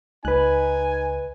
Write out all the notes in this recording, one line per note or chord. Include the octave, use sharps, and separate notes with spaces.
C#2 D#4 B4 G#5 F#6